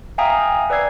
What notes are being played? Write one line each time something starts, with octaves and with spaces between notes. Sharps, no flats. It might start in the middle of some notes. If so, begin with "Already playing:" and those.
E5 F5 G5 G#5 A#5 D#6
B4 D5 G#5 E6 G#6 C7